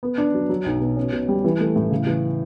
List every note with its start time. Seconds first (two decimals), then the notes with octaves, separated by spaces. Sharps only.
0.03 B3
0.18 D4
0.34 F#3
0.49 F#3
0.66 B1
0.81 B2
0.97 C#4
1.12 B2
1.29 G3
1.44 E3
1.60 A3
1.76 A2
1.91 C#3
2.07 E3